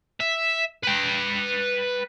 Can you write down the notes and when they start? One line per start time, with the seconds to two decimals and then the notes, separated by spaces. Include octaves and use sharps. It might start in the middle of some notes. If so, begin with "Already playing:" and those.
0.20 E5
0.83 B4 G5